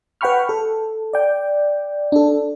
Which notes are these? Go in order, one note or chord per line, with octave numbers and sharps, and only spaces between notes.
B4 F#5 G5 B5 C#6 F6
A4
D5 G5
D4 A4